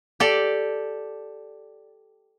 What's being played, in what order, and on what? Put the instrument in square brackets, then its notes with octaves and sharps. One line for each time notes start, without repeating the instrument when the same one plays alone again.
[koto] G4 A4 D5